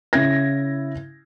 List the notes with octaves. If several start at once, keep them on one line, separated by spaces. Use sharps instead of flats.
C#3 E4 G#6 A#6